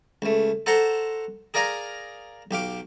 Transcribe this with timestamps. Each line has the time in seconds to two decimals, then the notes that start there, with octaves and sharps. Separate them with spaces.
0.22 C#2 A3
0.66 A4 C5 F#5 A#5 C6 C#6
1.54 G#4 A#4 D5 F5 G#5 A#5
2.51 B1 G4 F5 D6